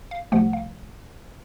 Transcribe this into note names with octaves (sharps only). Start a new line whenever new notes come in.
F5
C2 C3 F3 A3 F#5
F5